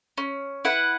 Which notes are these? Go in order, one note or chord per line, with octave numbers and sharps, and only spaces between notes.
C#4
E4 B4 F#5